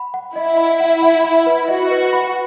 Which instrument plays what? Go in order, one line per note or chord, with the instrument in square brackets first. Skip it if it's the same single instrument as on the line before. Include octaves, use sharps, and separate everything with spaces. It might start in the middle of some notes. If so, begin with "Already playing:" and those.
Already playing: [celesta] F#5 B5
F#5
[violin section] E4 [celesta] D#5
[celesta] B5
F#5
F#5
B5
B4
[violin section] F#4 [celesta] D#5
[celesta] B4
B5